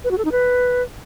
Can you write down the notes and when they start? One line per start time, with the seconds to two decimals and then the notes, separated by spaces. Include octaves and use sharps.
0.04 B4
0.11 F#4
0.18 A4
0.25 D#4
0.32 B4